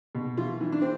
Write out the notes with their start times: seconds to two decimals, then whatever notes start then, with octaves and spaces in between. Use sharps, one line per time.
0.15 B2
0.37 E3 F4
0.61 E3
0.72 D4
0.82 C4